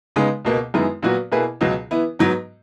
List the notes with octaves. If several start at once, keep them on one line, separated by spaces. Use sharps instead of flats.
C#3 G#3 B3 D#4
C#2 B2 A#3
F#2 D#3 G#3 B3 E4
A#2 F#3 B3 F#4
B2 A#3 E4 G#4 B4
C#2 B2 F#3
E3 B3 E4
G#2 F#3 B3